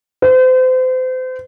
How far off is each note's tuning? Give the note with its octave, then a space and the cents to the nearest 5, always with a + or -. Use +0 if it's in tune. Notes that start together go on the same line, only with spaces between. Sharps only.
C5 -35